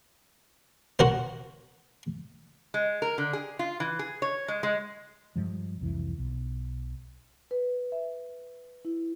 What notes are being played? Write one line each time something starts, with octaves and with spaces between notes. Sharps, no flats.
F#4 A#4 C5
G#3
A#4
D3
G#4
F4
E3
G#4
C#5
G#3
G#3
G2 F3 G#3
C2 F2 E3
B1
B4
E5
E4